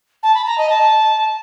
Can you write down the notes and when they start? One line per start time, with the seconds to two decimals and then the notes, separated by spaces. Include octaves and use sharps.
0.22 A5
0.34 B5
0.46 A#5
0.57 D#5
0.69 A5